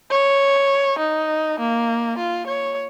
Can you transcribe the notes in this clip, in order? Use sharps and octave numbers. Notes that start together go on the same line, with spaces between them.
C#5
D#4
A#3
F4
C#5